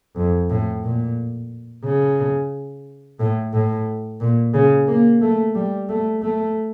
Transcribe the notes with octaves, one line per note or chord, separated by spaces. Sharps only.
F2
A2
A#2
C#3
A2
A2
A#2
C#3
A#3
A3
G3
A3
A3